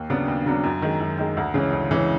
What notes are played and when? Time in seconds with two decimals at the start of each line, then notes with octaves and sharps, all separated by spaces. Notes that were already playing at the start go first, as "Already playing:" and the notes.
Already playing: D#2
0.09 C#3 F#3 B3 D4
0.28 D#2
0.46 C#3 F#3 B3 D4
0.64 F#2
0.82 D#3 G#3
1.00 F#2
1.18 D#3 G#3
1.37 D2
1.54 C#3 E3 G#3 C#4
1.73 D2
1.91 C#3 E3 G#3 C#4